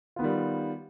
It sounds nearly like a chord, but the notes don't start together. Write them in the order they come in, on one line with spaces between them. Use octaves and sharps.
F4 B3 D#3 G3